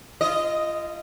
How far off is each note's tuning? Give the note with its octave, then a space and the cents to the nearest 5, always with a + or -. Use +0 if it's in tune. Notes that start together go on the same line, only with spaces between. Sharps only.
F4 -30 D#5 +0